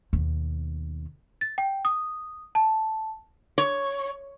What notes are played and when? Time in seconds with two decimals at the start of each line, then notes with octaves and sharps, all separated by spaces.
0.13 D#2 B2
1.41 A6
1.58 G5
1.85 D#6
2.55 A5
3.58 C#5